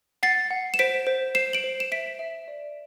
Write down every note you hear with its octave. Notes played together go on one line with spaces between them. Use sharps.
F#5 A6 C7
F#5
E7
C5 B6 D7
C5
C5 C7 E7
D7 F#7
C5
E7
E5 B6 D7
E5
D5